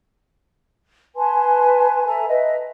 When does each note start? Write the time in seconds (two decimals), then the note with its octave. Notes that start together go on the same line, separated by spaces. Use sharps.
1.16 B4 G#5 A5 C6
2.06 A4 E5 G#5 A#5
2.28 B4 D#5 E5